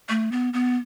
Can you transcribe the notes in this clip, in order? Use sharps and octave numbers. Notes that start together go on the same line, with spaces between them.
A3
B3
B3